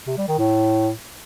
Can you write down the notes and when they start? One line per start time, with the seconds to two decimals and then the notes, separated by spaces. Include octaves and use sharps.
0.07 C3
0.18 G3
0.28 D#3
0.39 A2